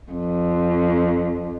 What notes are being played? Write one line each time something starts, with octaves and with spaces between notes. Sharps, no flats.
F2